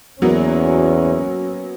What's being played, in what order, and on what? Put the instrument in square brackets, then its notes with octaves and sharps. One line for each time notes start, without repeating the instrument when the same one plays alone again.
[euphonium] E2 [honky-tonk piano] F#3 A#3 B3 [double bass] C#4